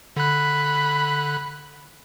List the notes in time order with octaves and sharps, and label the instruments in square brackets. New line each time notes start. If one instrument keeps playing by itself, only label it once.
[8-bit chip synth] D3 F#6 [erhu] B5